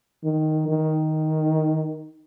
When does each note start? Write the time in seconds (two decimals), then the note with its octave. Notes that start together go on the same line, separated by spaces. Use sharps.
0.24 D#3
0.69 D#3